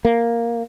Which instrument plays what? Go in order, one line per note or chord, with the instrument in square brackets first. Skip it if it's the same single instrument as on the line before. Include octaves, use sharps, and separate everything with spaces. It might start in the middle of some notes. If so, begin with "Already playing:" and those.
[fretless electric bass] A#3